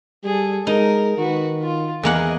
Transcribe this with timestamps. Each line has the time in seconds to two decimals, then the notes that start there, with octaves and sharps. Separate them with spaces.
0.24 G3 G#4 A4
0.67 G#3 D#4 A#4
1.18 D#3 F#4 B4
1.62 F4
2.03 E2 A#3 G#4 D#5 F#5